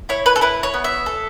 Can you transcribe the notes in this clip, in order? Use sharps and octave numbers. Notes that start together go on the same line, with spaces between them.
E4 C#5
B4
A4
E4 B4
C#5
B3
E5
A4